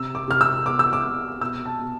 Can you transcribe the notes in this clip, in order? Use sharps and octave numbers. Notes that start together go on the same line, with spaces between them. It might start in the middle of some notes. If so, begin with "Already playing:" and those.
Already playing: C3 E6
D6
C3 F6
E6
B3 D6
E6
D6
C3
B2 E6
A5
B2